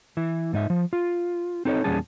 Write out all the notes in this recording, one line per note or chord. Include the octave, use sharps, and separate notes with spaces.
E3 E4
G#2 D#4 E5
F3
F4
C4 D#4 A4 C5 C#5 D#5
E2 A#2 G3 C#4 G#4 A5